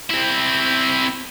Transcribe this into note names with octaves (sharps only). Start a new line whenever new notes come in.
C4 E4